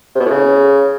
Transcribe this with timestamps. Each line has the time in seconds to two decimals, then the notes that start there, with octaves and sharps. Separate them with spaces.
0.15 C3
0.20 B2
0.25 A2
0.31 C#3